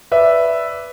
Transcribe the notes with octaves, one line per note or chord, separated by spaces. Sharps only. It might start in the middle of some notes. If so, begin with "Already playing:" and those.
B4 D5 E5